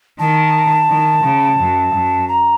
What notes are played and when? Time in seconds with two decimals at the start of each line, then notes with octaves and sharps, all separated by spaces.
0.19 D#3 A5
0.90 D#3
1.24 C#3
1.59 F#2
1.94 F#2
2.28 A#5